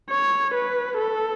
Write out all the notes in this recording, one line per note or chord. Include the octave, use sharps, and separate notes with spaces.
C#5
B4
A4